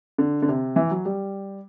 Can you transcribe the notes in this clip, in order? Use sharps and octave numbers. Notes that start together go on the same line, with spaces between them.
D3
D3
C3
E3
F#3
G3